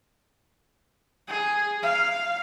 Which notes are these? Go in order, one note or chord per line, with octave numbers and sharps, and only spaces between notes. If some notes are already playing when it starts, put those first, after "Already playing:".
G#4
F5